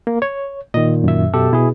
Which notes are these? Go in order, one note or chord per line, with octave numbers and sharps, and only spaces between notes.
A#3
C#5
A#2 D#3 D#5
F#2 E5
B2 G4 A4
B2 E4 G#4